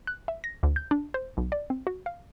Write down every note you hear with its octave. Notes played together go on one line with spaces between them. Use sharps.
F#6
E5
A#6
D2
G6
D4
C5
B1
D5
C4
F#4
F5